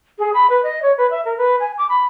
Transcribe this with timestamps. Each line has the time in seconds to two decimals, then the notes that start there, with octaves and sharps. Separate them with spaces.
0.19 G#4
0.34 B5
0.50 B4
0.63 D#5
0.82 C#5
0.98 B4
1.11 E5
1.25 A#4
1.38 B4
1.60 G#5
1.78 D6
1.89 B5